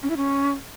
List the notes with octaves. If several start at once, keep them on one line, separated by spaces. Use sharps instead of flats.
C#4
E4
C#4